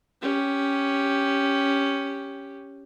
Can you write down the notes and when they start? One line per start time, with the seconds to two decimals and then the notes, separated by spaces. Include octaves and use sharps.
0.22 C#4 G4